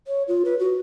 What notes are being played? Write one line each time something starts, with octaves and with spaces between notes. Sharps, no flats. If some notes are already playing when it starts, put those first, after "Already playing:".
C#5
F4
B4
F#4